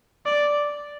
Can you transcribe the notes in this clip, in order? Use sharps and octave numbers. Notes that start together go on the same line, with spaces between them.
D5